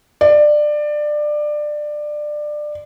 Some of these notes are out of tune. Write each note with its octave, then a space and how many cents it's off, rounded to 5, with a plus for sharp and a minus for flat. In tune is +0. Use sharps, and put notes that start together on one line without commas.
D5 +20